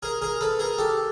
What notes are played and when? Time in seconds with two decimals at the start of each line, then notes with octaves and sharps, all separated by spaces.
0.03 G#4 A#4
0.22 G#4 A#4
0.41 A4 B4
0.59 G#4 A#4
0.78 G4 A4